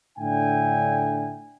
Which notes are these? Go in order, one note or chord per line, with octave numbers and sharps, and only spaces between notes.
A2 D3 D4 E5 G5 G#5